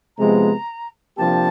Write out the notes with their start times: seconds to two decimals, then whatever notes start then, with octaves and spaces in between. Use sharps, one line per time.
0.17 C3 F3 G#3 B3 A#5
1.17 C3 F3 A#3 D4 G4 A5